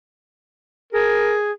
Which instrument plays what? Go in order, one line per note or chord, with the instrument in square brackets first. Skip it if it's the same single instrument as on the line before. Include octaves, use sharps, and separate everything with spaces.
[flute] G#4 [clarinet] A#4